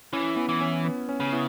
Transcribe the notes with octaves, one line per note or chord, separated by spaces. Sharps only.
E3 C#4
B3 E4
E3
C#4
B3
C#4
C#3
B3 E4